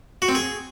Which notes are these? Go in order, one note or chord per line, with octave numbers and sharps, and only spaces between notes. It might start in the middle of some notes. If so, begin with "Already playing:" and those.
F#4
C4
G#4